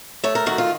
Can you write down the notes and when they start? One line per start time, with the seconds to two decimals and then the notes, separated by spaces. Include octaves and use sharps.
0.24 A3 C#5
0.35 A#4
0.46 D#3 F#4
0.58 F4